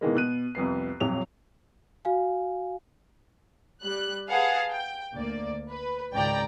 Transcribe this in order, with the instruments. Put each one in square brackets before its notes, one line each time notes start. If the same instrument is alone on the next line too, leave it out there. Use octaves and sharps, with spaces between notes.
[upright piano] B2 D#3 E3 G#3 A#3
B2 F#6 D#7
C2 F2 B3 C7
D#1 F2 F#3 F7
[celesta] F#4 F5 G#5
[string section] G3 F#6
G#4 B4 F5 F#5 A5
G5
D2 A#3 D5
B4
G#1 C#2 D5 G5 A#5